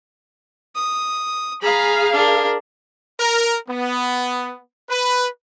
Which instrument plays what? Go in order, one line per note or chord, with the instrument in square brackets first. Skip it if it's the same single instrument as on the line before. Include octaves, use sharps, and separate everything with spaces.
[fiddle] D#6
[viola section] G#4 F5 [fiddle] A#5 B5
[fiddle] D4 A#4
[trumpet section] A#4
B3
B4